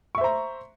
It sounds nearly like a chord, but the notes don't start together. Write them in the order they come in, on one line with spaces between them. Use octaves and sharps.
C#6 E5 C5 A#5